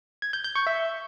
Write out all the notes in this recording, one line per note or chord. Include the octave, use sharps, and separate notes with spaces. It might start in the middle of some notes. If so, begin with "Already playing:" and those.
G#6
G6
G6
C#6
E5